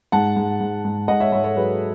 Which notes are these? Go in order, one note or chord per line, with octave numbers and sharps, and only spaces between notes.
G#2 F#5 A5
G#2
G#2
G#2
G#2 D#5 F#5
C#5 E5
G#2 C#5 E5
A4 C#5
F#3 G#4 B4